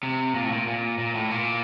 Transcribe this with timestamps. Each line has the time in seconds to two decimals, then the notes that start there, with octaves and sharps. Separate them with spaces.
0.03 C3
0.35 A#2
0.44 A2
0.53 A#2
0.67 A#2
0.99 A#2
1.15 A2
1.31 A#2